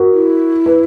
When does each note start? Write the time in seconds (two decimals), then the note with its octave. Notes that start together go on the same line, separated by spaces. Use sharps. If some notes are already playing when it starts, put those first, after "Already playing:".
Already playing: F#4 A#4
0.13 E4
0.66 B4